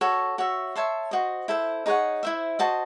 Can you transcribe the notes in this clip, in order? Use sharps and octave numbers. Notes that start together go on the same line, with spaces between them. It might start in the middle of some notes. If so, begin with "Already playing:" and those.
F#4 A4 C#5
F#4 C#5 E5
C#5 E5 A5 C6
F#4 C5 D#5
E4 A4 C5
D#4 G#4 C#5 F#5
E4 C5 E5
F#4 C5 D#5 A5